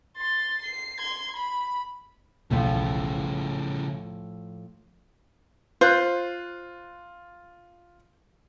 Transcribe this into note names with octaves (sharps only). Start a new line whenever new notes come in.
C6 A6
C7
C6 G#6
B5
E1 B1 E2 A2 C#3 F3 G3
F4 C5 F#6